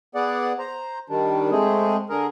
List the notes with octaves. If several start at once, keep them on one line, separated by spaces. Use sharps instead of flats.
B3 G#4 D5 F#5
C5 A#5
D#3 G3 D4
G#3 A3 C4 G#4
D3 G#4 A#4